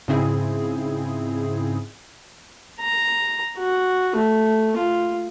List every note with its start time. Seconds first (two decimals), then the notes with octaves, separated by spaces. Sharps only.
0.08 G#2 C#3 C4 E4 G#4
2.80 A#5
3.58 F#4
4.16 A3
4.77 F4